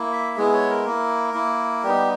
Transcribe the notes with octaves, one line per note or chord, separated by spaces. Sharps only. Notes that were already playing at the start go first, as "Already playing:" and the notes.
Already playing: A#3 E4
E5
G#3 B3 E4 G#4
C#5
A#4
A#3 E4
A#3 E4
G3 B3 D#4 G4